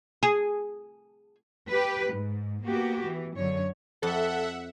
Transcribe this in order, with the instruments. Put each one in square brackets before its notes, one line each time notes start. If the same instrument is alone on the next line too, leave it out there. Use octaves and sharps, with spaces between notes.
[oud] G#4
[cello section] G4 B4
G#2
A#3 B3 F#4 G4
E3
F#2 D3 C#5
[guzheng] F2 [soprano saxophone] A4 [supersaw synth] E5 F#5